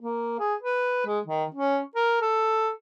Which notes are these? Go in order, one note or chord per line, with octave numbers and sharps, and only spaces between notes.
A#3
G#4
B4
G#3
D#3
C#4
A#4
A4